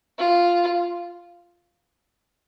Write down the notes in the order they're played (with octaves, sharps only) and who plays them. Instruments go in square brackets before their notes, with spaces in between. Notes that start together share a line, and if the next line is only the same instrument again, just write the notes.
[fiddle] F4